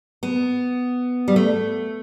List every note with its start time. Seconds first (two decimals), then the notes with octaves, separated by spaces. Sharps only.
0.23 B3
1.28 G3
1.36 A3